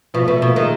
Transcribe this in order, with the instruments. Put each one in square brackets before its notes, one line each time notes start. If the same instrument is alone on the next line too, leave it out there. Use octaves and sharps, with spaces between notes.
[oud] B2 [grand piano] F3
[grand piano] A3
[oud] B2
[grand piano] A3
[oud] B2
[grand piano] A#3
[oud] D#3 [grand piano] G#3